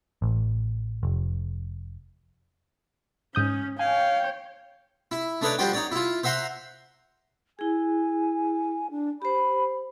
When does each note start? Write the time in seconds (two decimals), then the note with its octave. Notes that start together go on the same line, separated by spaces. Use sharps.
0.22 A1
1.03 F1
3.35 G#2 C#4 D#6 G6
3.79 C#5 F5 G5 G#5
5.11 E4
5.41 A3 D4 D#4 B4 C#5 D5
5.58 F3 G3 F#4 C5 D5 G5
5.73 D#4 C#5 D5
5.92 E4 F4
6.23 C5 E5 F#5 A#5 C6
7.59 E4 G#4 G#5
8.91 D4
9.22 G4 C5 B5